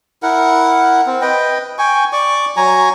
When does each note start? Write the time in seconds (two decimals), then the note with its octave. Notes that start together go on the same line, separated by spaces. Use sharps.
0.23 E4 A#4 F#5
1.06 C4
1.22 B4 D#5 G5
1.78 G5 G#5 C#6
2.13 D5 C#6 D6
2.57 F#3 G#5 A#5 C#6